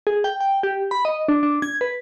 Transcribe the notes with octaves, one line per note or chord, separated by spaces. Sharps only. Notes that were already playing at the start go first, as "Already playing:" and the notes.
G#4
G5
G5
G4
B5
D#5
D4
D4
G#6
B4